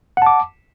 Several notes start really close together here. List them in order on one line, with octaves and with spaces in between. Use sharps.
F#5 A5 D6